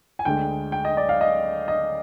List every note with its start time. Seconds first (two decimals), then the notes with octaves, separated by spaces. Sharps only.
0.19 G#5
0.25 D2 D3 G#3 G5
0.72 G5
0.85 D#5
0.97 D5
1.09 F5
1.21 D#5
1.68 D#5